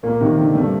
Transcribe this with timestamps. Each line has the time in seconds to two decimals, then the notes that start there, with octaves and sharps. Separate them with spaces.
0.03 A#2 A#3
0.21 C3 D#3
0.37 D3 D#3
0.55 G2 A3